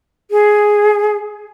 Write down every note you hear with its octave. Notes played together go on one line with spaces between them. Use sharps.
G#4